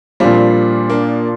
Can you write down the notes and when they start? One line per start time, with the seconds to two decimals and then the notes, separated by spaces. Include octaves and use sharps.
0.20 A#2 F3 G3 C4 D4 F4
0.90 A#3 D4